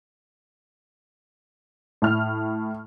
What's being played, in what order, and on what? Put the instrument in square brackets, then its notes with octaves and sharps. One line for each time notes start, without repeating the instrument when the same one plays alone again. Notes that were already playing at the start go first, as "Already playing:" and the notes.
[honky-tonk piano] A2 F6